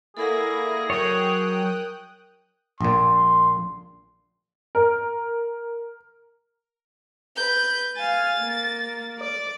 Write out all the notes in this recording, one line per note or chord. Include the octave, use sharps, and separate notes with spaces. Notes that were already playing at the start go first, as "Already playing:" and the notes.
A#3 E4 G#4 A4 D5 F#5 A#6
F#3 A#4 C#5 G5 D#6 F#6
A#1 A#2 C6
A#4
B4 G6
F5 G#5 A6
A#3
D5